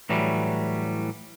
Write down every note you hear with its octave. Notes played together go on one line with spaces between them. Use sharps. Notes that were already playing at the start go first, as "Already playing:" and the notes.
A2 E3 F#3 G3